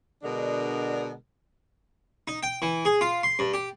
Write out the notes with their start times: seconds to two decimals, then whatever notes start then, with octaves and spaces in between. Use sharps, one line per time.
0.23 B2 D3 G#3 D4 A#4
2.28 D#4
2.43 G5
2.62 E3
2.85 G#4
3.01 F4
3.23 C6
3.39 G2
3.54 G4